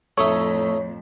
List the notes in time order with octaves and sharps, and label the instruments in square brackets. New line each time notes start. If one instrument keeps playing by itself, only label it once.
[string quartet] F2 A2 [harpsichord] A3 D#4 E5 [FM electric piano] C#5